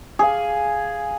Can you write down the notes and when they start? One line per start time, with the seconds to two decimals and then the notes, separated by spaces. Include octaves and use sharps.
0.19 G#4 F5